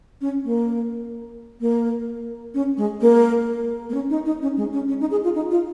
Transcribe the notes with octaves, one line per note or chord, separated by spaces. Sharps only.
C#4
A#3
A#3
C#4
G#3
A#3
A#3
C#4
D#4
D#4
C#4
G#3
C#4
C#4
D#4
G#4
F4
D#4
F4